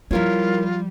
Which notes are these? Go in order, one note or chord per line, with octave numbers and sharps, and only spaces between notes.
F3 G3 E4 F4 A#4 C#5